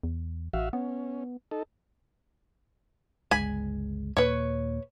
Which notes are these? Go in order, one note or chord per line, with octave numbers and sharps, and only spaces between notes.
E2
A1 F#4 E5 F5
B3 C#4
D#4 A4
G1 C#2 G#3 G#5 B5
D#2 A#2 A#3 B4 C#5